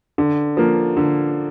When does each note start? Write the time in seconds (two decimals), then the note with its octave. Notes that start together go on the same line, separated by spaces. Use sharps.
0.18 D3
0.57 F3 A#3
0.97 D3